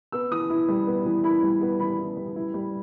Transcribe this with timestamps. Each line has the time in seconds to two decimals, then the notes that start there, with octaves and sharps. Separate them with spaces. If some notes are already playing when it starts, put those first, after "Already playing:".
0.12 B3 E6
0.31 E3 D#6
0.50 E4
0.69 G3
0.87 B3
1.05 E3
1.24 E4 B5
1.43 G3
1.61 B3
1.80 E3 B5
1.98 E4
2.17 G3
2.36 E4
2.54 G3